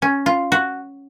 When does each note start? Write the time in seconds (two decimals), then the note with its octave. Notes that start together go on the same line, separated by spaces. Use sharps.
0.02 C#4
0.26 F4
0.52 F#4